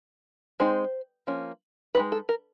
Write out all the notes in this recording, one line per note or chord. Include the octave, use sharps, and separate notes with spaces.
G#3 C4 D#4 C5
F3 A#3 C#4
G#3 C4 D#4 B4
A4
A#4